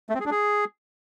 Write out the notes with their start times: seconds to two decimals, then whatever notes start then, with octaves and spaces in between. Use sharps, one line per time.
0.10 A3
0.15 C4
0.20 G#4
0.26 D4
0.31 G#4